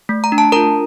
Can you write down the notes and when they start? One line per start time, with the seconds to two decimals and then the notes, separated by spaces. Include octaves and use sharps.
0.09 A3
0.24 A#5
0.32 D4
0.38 A5
0.52 F4 A#4 A#5